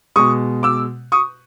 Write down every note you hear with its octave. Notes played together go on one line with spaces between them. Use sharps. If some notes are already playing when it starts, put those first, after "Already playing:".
B2 G#3 C#6 D#6
D6 E6
C#6 D#6